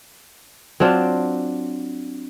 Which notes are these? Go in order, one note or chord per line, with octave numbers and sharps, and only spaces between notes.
F#3 C4 D4 F4